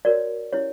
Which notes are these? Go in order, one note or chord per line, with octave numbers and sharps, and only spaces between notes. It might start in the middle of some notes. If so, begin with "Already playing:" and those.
F#4 A#4 C#5 D5
C#4 E4 G4 C#5